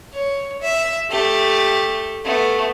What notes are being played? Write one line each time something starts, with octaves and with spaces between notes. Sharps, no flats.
C#5
E5
A3 G4
A3 B3